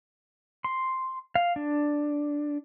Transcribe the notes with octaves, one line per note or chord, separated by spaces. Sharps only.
C6
F5
D4